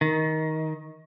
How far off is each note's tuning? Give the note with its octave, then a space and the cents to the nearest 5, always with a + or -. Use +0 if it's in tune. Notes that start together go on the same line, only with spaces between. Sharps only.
D#3 +20